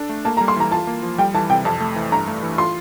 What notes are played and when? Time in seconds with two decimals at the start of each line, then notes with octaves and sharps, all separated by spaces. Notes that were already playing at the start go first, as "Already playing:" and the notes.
Already playing: D4 A4
0.09 A3
0.25 A#3 A5
0.37 A#5
0.41 G3
0.48 C6
0.56 E3 A#5
0.72 F4 A5
0.87 A#3
1.03 F3
1.18 G3 G5
1.34 E3 A5
1.50 C3 G5
1.65 F2 A5
1.80 A3
1.96 E3
2.12 G2 A#5
2.28 A3
2.43 E3
2.58 F4 C6